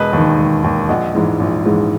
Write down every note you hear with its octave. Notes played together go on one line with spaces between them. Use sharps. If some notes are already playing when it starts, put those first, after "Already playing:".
Already playing: E1 B4 D#5
D#2 D#3
E1
D#2 D#3
A#1 D#5 F#5
G#2 E3 G#3
A#1
G#2 E3 G#3